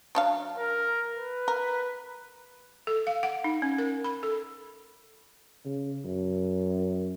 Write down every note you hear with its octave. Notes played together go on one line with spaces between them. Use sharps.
F#3 D4 F5
A#4
B4
A#4
A4
F5
F#5
D#4
C#4
A#4
B5
A4
C#3
F#2